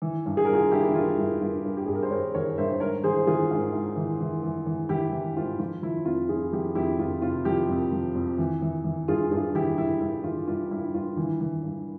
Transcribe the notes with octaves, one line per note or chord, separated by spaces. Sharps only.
E3
G2
G#4
G2 A#4
F4 G#4
G2 E4 G4
E4
E3 F4
G2 E4
G2 F4
G2
G4
G2 G#4
A#4
C5
G2 A#4 C#5
E3 A#4 C#5
G2 C5 E5
G#2 A#4 C#5
E3 G#4 C5
E3 F4 G#4
G#2
G#2
E3
E3
E3
E3
E3 E4 G4
E3
G#2 F4
F3 F4
F3 E4
F2 F4
F2 F4 G#4
F3 E4 G4
F2 E4 G4
F2 F4
C3 F4
F3 E4 G4
F2
F3
F2
E3
E3
E3
G2 F4 G#4
G2 F4 G#4
E3 E4 G4
E3 E4
G2 E4
E3 F4
G2 F4
G2 E4
G2 F4
E3 E4
E3
G2